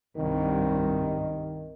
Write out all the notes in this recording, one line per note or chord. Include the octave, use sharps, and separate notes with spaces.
C2 G2 D#3